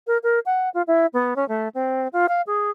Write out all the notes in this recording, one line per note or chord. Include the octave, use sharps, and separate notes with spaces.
A#4
A#4
F#5
F4
E4
B3
C#4
A3
C4
F4
F5
G#4